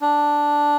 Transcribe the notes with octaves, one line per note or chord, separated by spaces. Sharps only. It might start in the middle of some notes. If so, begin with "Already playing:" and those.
D4